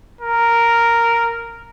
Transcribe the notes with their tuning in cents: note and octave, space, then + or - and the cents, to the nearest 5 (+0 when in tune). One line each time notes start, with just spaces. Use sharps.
A#4 -5